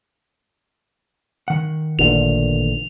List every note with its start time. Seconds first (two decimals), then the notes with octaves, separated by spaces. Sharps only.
1.48 D#3 F#5
1.99 A1 A#2 D3 F7